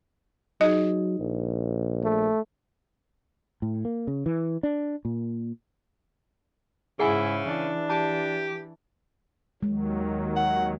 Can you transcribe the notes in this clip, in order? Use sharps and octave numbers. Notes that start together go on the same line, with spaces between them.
F#3 D#4 G#4 D#5
A#1
A3
A2
A#3
C#3
E3
D4
A#2
G#2 C#3 E4 G#4 F#5 G#5
E3 D4
G4 A5
D#2 D#3 F#3 G#3
F#5